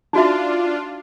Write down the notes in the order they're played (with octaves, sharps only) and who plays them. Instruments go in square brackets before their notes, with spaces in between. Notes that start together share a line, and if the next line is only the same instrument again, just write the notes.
[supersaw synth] D4 F4 [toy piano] D#4 F#4 E5